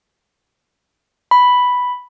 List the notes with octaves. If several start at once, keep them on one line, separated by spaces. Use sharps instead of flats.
B5